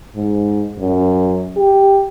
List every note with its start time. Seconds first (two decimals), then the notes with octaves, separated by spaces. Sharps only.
0.16 G#2
0.79 F#2
1.57 G4